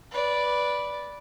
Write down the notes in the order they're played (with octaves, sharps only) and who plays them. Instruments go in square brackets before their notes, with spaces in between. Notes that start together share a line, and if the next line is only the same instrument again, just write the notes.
[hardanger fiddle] B4 D5